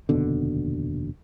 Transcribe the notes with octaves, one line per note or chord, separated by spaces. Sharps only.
F1 D#2 B2 D3